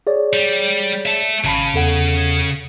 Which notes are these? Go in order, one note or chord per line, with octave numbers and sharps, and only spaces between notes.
G#4 C#5 D5
G3
E5 A5
G#1 C#3 A5 B5
E2 A4 F#5